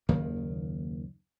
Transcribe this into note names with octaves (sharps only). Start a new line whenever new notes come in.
F#1 D#2 D#3 A#3